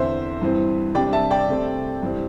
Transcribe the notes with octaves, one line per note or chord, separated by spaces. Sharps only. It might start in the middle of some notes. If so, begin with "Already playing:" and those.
Already playing: E2 D3 C4 C5 E5
G2 E3 C4
C3 G3 D4 D5 G5
E5 A5
D5 G5
C3 A3 C4
G2 E3 G3 C4